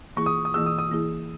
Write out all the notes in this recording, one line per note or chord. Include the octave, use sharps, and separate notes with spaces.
E3 A#3 E4 G#4 C#6
D#6
D#6
E3 A#3 E4 G#4 E6
D#6
D#6
E3 A#3 E4 G#4